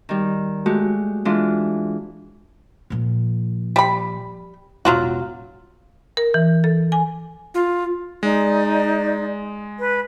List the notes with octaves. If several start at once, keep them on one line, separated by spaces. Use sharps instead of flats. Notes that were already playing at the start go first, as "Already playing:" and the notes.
D#3 G3
G#3 A3 F#4 G4
E3 G#3 D4 F4
A#2 F3
G3 B5
E1 A1 F#3 F4 F#4
A#4
E3
A4
G#5
F4
G#3 D#4 D5
B4